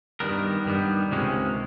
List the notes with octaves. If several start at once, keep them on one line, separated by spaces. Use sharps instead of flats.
G2 D#3 G3 B3 A#4
G2 D#3 G3 B3
C#2 C3 D#3 G#3 C#4